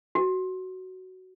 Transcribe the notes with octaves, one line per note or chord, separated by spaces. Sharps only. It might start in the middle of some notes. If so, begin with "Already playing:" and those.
F#4